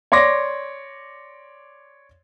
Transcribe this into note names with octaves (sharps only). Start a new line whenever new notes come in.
C#5 D5 C6 D6 A#6